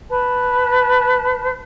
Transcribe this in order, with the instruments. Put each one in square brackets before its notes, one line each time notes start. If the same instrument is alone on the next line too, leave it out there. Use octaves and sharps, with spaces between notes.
[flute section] B4 A5